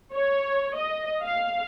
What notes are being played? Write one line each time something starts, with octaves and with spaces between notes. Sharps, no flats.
C#5
D#5
F5